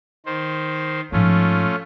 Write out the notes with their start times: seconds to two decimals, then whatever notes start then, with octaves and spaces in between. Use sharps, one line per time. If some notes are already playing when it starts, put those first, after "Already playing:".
0.26 D#3 C5
1.12 G#2 F3 A3 C#4 F4